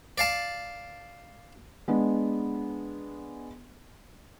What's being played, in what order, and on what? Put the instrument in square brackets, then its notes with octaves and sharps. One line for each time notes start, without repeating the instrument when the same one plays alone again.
[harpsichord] D5 F5 A5
[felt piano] G#3 B3 D4